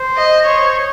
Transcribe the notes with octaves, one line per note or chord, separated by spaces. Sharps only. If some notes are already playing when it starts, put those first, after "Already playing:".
Already playing: C5
D#5
C5 C#5